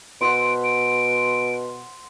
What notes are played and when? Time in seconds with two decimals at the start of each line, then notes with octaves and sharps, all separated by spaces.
0.21 B2 C5 E5 F#5 D7
0.64 D7